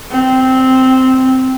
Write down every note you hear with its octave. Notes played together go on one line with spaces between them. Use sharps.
C4